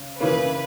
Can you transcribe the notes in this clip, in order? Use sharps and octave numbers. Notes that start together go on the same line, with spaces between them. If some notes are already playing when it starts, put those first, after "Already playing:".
Already playing: C#3 C#4
C#3 E3 A#3 C#4 B4